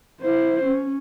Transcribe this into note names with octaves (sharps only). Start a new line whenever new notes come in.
E4 C5
C#4